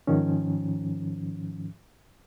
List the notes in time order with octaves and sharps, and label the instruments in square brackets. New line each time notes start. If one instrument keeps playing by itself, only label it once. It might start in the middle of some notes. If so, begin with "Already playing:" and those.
[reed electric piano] G#2 D#3 F3 C#4